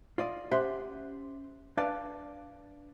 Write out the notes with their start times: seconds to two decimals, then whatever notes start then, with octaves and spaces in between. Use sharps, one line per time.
0.18 F4 D5 D#5
0.51 C#4 G4 C5 E5 F#5 C6
1.77 D4 B4 D5 F5 A5